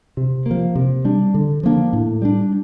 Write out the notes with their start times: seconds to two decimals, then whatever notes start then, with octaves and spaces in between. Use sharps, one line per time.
0.17 C3
0.46 F3 A#3
0.75 C3
1.05 G3 D4
1.34 D3
1.63 F3 A#3 D4
1.93 A2
2.22 G3 D4